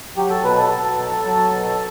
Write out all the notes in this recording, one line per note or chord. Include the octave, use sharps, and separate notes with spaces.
F#3 G4
A4
B2 B4
A4
B2
F#3
F#3
B2